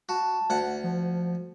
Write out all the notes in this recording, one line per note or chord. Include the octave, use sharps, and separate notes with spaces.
F#4 A5
D2 F#5
F3